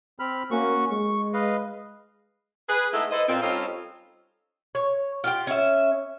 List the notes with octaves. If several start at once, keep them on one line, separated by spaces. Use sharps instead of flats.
C4 B5 F6
A#3 C#4 F#4 C#6
G#3 C#6
B4 D#5 F5
G#4 B4
G#3 A3 B3 D#4 E4 A4
E4 A4 B4 C5 D#5
A#2 C4
G3 C4 C#4 D#4 F4 A4
C#5
F4 G4 G5
C#4 E5